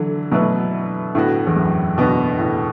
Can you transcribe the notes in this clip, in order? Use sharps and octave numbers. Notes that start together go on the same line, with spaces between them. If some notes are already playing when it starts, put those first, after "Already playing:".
Already playing: D3 E3 F#3
B2 F#3 A3 E4 B4
A2 D3 B3 F#4
E2
F#2
B2 D3 B3 F#4
A2